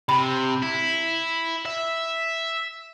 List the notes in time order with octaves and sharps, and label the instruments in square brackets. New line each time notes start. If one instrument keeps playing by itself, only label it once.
[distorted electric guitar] C3 [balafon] B5
[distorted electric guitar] E4
E5